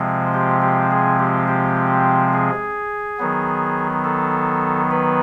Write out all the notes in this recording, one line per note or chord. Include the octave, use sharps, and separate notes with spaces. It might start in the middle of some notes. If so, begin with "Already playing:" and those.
Already playing: C3 F3 G#3 C4
G4
G4
G#4
G4
G4
G#4
D#3 F#3 B3
A4
B4